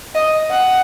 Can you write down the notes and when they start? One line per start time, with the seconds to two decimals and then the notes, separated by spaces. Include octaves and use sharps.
0.15 D#5
0.50 F#5